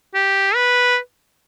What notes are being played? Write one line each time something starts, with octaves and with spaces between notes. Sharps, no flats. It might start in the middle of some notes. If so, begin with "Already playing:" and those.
G4
B4